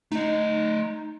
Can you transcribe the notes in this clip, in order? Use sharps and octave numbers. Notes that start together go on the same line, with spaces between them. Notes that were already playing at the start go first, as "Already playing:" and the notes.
A3 D#4 D#5